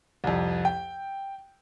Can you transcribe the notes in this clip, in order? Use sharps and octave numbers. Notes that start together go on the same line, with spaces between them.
C2 F2
G5